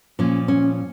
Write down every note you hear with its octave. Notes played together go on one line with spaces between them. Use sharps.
A#2 F3 C#4
C#4